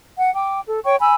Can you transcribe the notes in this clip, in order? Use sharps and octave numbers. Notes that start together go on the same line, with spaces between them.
F#5
G5 D6
A4
C#5 G5 C#6
G#5 B5 E6